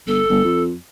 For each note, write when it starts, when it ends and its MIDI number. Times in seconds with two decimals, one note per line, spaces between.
0.07 0.22 31
0.07 0.62 69
0.29 0.44 31
0.44 0.73 41